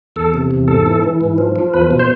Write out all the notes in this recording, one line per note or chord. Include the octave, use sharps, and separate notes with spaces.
E2 A4
C3
E2
G#2 A4
E3
E3
G#2
F3
F3
E2 B4
B2
C5